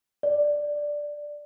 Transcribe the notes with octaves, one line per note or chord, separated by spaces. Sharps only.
D5